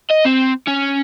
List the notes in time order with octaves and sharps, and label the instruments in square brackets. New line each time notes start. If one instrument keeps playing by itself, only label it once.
[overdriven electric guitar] D#5
C4
C#4